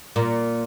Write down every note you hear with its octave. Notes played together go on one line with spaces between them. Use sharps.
A#2